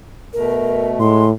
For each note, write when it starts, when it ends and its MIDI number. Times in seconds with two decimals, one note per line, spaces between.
0.33 0.99 47
0.33 0.99 57
0.33 0.89 70
0.99 1.31 45
0.99 1.25 56
0.99 1.27 84